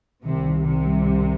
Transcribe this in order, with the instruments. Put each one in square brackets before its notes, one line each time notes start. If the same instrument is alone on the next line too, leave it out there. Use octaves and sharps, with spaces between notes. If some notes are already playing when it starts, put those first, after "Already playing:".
[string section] C2 C3 [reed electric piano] D#3
[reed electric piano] D#3
[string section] C2 C3 [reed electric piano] D#3
[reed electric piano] G3
G3